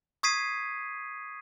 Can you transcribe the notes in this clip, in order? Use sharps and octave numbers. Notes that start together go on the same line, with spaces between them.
C#6 D#6 G#6 B6 C7 D#7